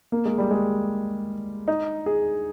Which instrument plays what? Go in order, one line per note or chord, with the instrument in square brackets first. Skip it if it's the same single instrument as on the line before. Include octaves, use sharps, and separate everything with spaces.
[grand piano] A#3
G#3
G3
G#3
D#4
G#4